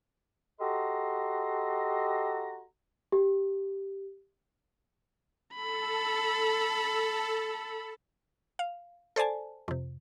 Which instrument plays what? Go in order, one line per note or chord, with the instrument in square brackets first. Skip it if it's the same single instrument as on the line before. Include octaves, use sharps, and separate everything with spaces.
[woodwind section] F#4 G4 A4 D#5 A#5 C6
[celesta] G4
[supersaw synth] A4 [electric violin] B5
[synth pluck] F5
A4 C5 D5 G#5 A5
F2 C3